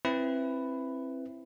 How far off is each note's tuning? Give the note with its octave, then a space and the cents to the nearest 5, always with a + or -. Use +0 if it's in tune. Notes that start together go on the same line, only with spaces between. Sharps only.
C4 +20 E4 +10 B4 +10